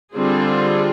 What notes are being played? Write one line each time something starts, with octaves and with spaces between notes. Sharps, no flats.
D3 G3 C4 F4 G#4